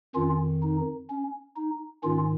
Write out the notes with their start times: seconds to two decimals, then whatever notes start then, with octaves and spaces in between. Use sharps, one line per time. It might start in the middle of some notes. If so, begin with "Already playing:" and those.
0.15 F2 D#3 C#4 F4
0.63 D#4
1.09 C#4
1.56 D#4
2.03 G#2 D#3 C#4 F4